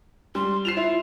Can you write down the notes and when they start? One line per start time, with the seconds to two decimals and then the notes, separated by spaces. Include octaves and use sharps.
0.35 G3 C6
0.65 F4 C7 E7 F7
0.77 E4